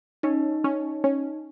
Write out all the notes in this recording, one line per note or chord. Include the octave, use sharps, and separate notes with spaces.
C#4 D#4
C#4
C#4